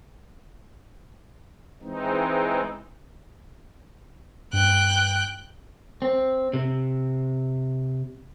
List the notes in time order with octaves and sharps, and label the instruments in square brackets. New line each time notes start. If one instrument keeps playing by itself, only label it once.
[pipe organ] E3 G#3 C4 D#4
[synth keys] G2 [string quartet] G5 F#6 G6
[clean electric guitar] C4
C3